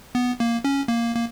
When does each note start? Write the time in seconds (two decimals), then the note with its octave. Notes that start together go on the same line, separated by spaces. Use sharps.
0.15 B3
0.40 A#3
0.64 C#4
0.88 A#3
1.16 A#3